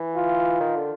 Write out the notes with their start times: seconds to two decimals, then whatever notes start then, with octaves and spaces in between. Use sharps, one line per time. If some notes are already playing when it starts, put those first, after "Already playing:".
Already playing: E3
0.16 F4
0.60 D#3
0.76 D3